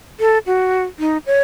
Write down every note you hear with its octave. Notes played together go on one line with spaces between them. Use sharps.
A4
F#4
D#4
C#5